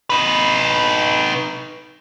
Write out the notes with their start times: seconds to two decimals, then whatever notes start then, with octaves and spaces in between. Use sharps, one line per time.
0.10 D#4 B4